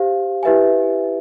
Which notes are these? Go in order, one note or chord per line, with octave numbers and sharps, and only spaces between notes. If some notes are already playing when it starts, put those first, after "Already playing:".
Already playing: G4 C5 F5
E4 G4 B4 E5 G#5